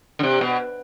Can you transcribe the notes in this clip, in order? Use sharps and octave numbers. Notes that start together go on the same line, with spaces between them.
D3
C3
B2